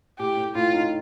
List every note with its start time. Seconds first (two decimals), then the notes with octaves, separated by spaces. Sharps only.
0.18 A2 G4
0.37 A2
0.55 A2 F4
0.73 D#4